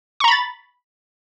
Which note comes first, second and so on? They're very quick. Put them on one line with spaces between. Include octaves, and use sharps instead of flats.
C#6 A#5 B5 A6